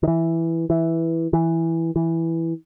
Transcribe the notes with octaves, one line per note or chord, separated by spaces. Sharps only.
D#3
E3
E3
E3
E3